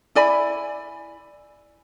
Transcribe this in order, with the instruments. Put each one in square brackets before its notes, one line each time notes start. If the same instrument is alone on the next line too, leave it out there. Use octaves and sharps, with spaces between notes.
[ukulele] E4 D5 G#5 B5